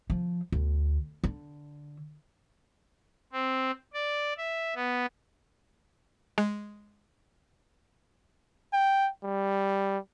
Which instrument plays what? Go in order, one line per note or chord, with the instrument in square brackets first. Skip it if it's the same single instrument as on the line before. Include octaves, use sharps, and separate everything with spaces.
[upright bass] F3
D2
D3
[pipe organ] C4
D5
E5
B3
[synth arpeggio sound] G#3
[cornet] G5
G3